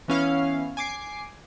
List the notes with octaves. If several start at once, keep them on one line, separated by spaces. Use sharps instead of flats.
E3 B3 C#4 E4 F5
G#5 D6 C7